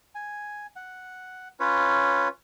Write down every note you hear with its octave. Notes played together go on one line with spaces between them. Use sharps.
G#5
F#5
C#4 F4 B4 C#5